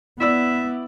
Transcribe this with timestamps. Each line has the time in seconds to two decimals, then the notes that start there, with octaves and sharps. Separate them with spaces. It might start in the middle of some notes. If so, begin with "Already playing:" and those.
0.20 B3 E4 D5 E5 E6